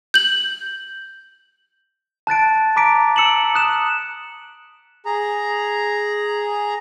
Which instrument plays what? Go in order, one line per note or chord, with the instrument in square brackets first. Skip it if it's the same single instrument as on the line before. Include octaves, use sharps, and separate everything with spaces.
[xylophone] G6 F#7
[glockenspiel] A5 F#6 A6 D7
A#5 D6 B6 D7
E6 C#7 E7 F#7
D#6 F#6 E7
[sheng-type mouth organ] G#4 A#5